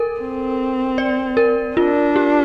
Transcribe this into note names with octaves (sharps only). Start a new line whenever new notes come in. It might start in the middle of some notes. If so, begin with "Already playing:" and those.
Already playing: A4 A#4
C4
D5
A#4
D4 F4
G4